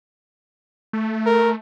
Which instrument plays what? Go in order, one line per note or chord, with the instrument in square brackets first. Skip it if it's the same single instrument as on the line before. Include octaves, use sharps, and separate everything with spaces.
[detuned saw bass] A3
[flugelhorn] A#4